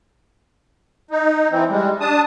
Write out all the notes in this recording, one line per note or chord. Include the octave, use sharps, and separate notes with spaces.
D#4
E3 C4
G3 G#3
D4 A5 D#6